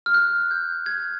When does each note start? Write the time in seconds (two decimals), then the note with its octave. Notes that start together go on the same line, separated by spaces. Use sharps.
0.06 F6
0.14 F#6
0.51 G6
0.86 G#6